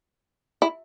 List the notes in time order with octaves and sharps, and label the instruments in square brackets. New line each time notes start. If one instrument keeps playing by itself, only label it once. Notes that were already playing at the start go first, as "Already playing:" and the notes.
[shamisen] E4